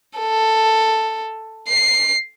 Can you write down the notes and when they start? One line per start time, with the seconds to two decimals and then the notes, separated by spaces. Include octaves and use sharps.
0.18 A4
1.68 C7